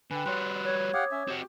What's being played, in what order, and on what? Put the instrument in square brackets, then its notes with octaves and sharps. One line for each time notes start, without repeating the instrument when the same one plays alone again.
[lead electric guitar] D3 [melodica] B4 [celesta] G5 G#5
[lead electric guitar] G3 F#4 [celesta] C#5 C6 F#6
[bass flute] C#5 [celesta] F#6 G#6
[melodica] G4 F5 F#5 [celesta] D6 D#6 G#6
[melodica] C#4 E5
[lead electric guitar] C4 F#4 [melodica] G4